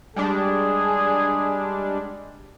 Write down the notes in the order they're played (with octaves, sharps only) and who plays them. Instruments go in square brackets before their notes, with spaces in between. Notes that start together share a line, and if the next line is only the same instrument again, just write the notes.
[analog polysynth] G3 G#3 D4 [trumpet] G#4